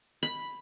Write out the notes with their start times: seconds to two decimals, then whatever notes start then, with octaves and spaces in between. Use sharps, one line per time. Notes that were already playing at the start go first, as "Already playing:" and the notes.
0.23 B5